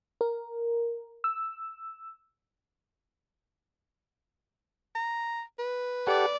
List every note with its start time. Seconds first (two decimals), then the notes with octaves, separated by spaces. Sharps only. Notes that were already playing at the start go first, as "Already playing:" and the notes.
0.21 A#4
1.24 E6
4.95 A#5
5.59 B4
6.07 G4 A4 D5 F#5